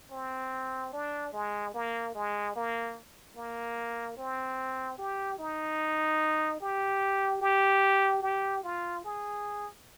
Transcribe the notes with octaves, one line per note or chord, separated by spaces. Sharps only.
C4
D4
G#3
A#3
G#3
A#3
A#3
C4
G4
D#4
G4
G4
G4
F4
G#4